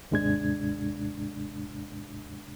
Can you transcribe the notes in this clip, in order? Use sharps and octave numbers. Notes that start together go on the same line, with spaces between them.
D#2 G#2 C3 G#3 D4 G#6